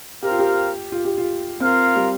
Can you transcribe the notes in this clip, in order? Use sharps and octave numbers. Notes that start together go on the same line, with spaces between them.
C4 G4 A#4 F5
F4
G4
F4
G4
F4
C4 F4 A#4 F5
G3